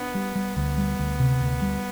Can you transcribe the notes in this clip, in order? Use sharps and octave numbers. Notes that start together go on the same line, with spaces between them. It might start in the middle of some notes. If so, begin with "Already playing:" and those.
Already playing: B3 D4
G3
G3
D2 B3
G3
D2
C3
D2
G3